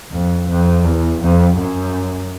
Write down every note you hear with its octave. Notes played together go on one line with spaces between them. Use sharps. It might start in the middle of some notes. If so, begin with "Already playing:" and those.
F2
F2
E2
F2
F#2